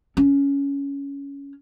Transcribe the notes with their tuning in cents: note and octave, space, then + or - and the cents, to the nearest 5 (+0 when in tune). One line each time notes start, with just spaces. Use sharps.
C#4 +15